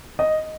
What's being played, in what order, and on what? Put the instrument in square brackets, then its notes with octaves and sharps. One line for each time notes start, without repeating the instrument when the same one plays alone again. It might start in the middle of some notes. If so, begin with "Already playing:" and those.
[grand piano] D#5